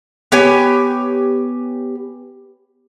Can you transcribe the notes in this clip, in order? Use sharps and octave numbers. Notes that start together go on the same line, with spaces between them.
B3 G4 C#5 G#5